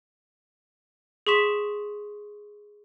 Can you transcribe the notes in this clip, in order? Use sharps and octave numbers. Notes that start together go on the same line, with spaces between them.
G#4 C6 C#6 B6 E7